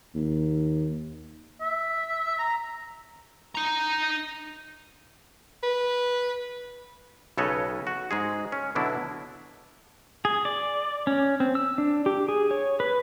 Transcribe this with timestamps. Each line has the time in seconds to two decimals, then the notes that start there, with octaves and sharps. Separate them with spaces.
0.15 D#2
1.61 E5
2.39 A#5
3.55 D#4 A#5
5.63 B4
7.38 B1 C#3 A4 B4 C#5 D#5
7.87 F#4
8.11 G#2 G#3 G#4
8.52 C#4
8.75 B2 D3 F#3 D4 E4
10.25 G#4
10.45 D5
11.07 C#4
11.40 C4
11.55 E6
11.78 D4
12.06 G4
12.28 G#4
12.51 C#5
12.80 B4